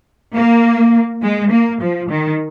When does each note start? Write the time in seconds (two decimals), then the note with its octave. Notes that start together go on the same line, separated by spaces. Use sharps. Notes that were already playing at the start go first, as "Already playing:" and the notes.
0.36 A#3
1.23 G#3
1.51 A#3
1.81 F3
2.10 D#3